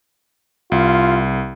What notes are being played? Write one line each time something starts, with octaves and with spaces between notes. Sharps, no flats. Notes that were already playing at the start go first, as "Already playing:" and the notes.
C2 F4